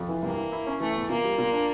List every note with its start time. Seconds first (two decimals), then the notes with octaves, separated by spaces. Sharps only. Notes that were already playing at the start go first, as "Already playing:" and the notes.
Already playing: F2
0.08 E3
0.23 G2 A#3
0.37 E3
0.52 E4
0.67 C#4
0.80 E3 A3
0.96 E2
1.09 A#2 A#3
1.24 G3
1.38 A#2
1.53 D4